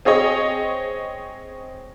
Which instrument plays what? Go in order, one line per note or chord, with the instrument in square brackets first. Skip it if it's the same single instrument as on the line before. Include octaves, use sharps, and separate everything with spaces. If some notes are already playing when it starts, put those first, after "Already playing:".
[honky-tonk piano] C4 G#4 C#5 D#5